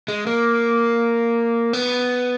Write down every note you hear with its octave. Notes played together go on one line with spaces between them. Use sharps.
G#3
A#3
B3